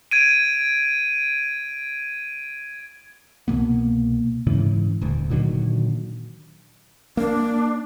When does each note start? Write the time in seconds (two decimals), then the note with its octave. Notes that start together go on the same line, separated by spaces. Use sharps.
0.11 G#6 D7 D#7
3.48 C2 B2 A#3 B3
4.47 G#2 C#3 E3
5.01 D#1 D2
5.30 A#2 D3 D#3 F#3
7.17 A#3 D4